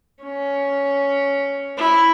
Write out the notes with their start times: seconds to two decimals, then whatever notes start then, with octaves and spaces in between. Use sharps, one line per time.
0.23 C#4
1.78 E4